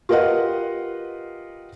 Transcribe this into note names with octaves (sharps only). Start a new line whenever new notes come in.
F4 G4 A#4 B4 D#5 F#5